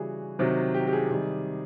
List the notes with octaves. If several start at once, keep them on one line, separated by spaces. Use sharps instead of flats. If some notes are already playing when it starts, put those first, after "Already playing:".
Already playing: C#3 E3 G3 F#4 G#4
C3 D#3 F#3
G4
G4
G#4
C3 D#3 G3